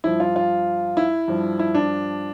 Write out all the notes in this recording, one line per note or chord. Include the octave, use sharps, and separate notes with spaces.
G2 F3 E4
F4
F4
E4
G2 F3
E4
D4